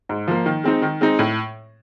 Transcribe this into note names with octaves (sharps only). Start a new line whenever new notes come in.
G#2
F3 A#3
D#3
G#3 C4 D#4
D#3
G#3 C4 D#4
A2